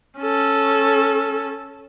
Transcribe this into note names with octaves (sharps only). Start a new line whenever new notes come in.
C#4 A4